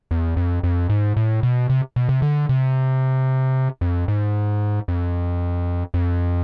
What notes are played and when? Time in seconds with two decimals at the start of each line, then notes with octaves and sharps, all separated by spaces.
0.11 E2
0.37 F2
0.64 F2
0.89 G#2
1.16 A2
1.43 B2
1.70 C3
1.96 B2
2.09 C3
2.22 D3
2.49 C3
3.81 F2
4.08 G#2
4.88 F2
5.94 F2